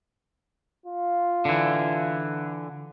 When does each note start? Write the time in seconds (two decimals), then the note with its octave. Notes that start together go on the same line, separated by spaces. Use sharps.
0.86 F4
1.45 D3 E3